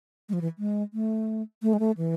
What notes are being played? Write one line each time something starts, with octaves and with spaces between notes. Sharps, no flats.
G#3
F3
E3
G#3
A3
A3
G#3
A3
E3